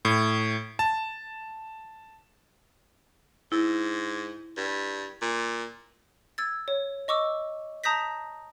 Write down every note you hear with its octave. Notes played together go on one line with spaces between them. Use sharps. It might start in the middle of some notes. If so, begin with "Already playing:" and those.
A2
A5
G#2 E4
G2
A#2
E6 G#6 A6
C#5
D#5 C#6 D6 E6
A5 A#5 D#6 G6 A#6 B6